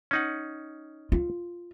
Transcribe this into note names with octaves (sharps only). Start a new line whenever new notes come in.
C#4 D#4 F#5
F4